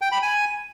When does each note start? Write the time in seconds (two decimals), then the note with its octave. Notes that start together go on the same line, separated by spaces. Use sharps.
0.01 G5
0.12 B5
0.22 G#5